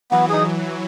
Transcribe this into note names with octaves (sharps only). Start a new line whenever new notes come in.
E3 F#3 B3
D#4 G#4